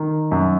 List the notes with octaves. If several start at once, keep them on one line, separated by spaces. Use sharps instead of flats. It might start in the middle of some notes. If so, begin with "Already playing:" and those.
Already playing: D#3
F#2